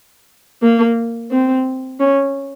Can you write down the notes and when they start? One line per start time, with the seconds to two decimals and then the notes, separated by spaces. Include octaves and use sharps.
0.62 A#3
1.31 C4
2.00 C#4